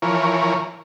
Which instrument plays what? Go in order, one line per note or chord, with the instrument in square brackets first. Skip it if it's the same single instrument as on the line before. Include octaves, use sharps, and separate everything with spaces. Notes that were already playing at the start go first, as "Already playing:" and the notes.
[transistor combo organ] E3 F3 A#4 C#5